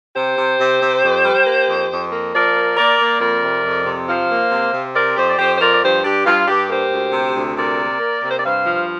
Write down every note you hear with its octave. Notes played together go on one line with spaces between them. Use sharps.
C3 G4 C5
C3
C3
C3
F2
G3
A#3
F2
F2
A#3
F3 A#4 D5
A#3
A#3 A#4 D5
A#3
F2 A#4 D5
C3
F2
C3
F3 C5 F5
A#3
C3
C3
C4 A#4 D5
F2 G4 C5
D5
F2 G4 C5
C5
F3 A#4 D5
D5
G2 G4 C5
G2 D4 G4
G2 F4
G2 D4 G4
A#3 G4 C5
D2
C3
D2
C3 A#4 D5
A#3
A#3
C3
C5
D5
G2 C5 F5
F3